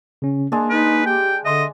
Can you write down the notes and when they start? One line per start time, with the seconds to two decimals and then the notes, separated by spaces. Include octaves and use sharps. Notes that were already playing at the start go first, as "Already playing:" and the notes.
0.22 C#3 C#4
0.52 G#3 A#3 D4
0.70 D#4 B4
1.06 G4 G5
1.45 D3 D#5 E5 C6